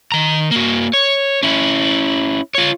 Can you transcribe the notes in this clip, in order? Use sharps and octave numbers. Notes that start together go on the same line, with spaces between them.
D#3 A#5
A#3 F#4
C#5
C#4 E4
F4 C#5